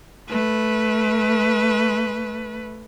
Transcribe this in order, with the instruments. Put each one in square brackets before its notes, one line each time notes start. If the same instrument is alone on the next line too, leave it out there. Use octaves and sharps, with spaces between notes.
[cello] A3 B4